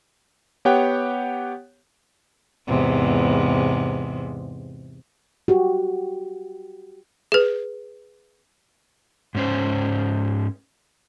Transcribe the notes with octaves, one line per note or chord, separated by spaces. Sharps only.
B3 G4 C#5 F#5 G5
E2 G#2 C3
F#4 G4
G#4 B4
G#2 C#4 C5